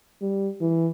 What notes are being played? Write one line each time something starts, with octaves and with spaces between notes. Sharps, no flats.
G3
E3